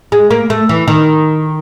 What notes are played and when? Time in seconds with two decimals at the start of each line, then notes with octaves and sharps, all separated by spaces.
0.12 G#3
0.30 A#3
0.50 A3
0.69 E3
0.88 D#3